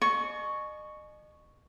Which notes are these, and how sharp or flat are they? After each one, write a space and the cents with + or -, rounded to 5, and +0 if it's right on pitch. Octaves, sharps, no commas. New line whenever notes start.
D#5 -35 G#5 +40 C#6 +0